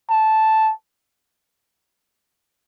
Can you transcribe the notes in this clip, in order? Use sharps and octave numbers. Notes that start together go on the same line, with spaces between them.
A5